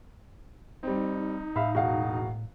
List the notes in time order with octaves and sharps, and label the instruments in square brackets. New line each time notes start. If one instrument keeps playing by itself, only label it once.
[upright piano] G3 C4 [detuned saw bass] D#4
[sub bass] A2 [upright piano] E5 F5 B5
[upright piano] E1 [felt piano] F#4 F5